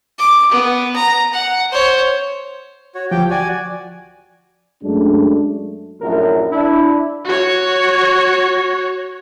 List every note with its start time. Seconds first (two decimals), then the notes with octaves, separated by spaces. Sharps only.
0.19 D6
0.52 B3
0.96 A#5
1.34 F#5
1.71 C5 C#5
2.95 F#4 C#5
3.11 D2 F3 G4 G5
3.30 F#4 D5 G#5
4.84 F#2 G#3 A3 D4
6.02 A#1 F#2 A2 A#4
6.52 D4 E4
7.25 F#4 C#5